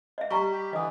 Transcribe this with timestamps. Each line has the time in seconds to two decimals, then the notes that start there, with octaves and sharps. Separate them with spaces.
0.18 D#5 E5
0.31 G3 G5 A#5 C#6
0.51 G4
0.73 D3 E3 D#5 D#6